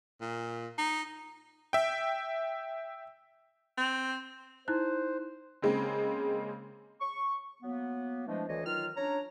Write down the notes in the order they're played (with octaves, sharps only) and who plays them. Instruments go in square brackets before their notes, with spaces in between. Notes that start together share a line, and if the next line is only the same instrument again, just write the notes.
[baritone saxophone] A#2
D#4
[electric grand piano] E5 G5
[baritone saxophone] C4
[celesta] D#4 E4 F#6 [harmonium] C5
[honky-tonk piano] C#3 G#3 A#3 C4
[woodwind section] C#6
F#3 A#3 B3
E3 F3 G#3 A3 D4
D2 E3 C#5 D#5
D#3 F#3 F4 F6
C#4 D4 C#5 A#5